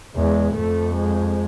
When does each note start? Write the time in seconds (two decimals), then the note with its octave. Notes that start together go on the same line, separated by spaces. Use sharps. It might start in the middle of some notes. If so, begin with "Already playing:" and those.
0.16 E2 G#3
0.55 F2 A3
0.95 G#3